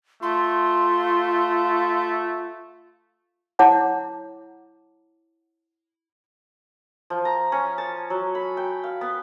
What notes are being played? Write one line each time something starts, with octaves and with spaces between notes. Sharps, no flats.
A3 F4 C6
E4 C#5 F#5 A5 A#5 D6
F3
A#5
C#4
A5
F#3
B5
G5
F5
B3